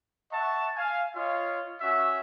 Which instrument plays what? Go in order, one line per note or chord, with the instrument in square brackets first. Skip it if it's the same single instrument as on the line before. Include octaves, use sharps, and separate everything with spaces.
[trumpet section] E5 F#5 A5 C#6
F5 G#5
F4 C#5 D#5 F5
C#4 F#4 E5